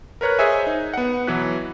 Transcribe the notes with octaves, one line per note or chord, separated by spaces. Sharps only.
A#4 B4 C#5 A#5 F#6
G#4 C5 C#5 D#5 E5 G#5
D#4
B3 F#5
B2 E3 F#3 B4 F#6